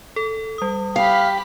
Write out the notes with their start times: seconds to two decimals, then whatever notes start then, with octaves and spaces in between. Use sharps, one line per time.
0.16 A4
0.58 G3 D#6
0.96 G4 F5 B5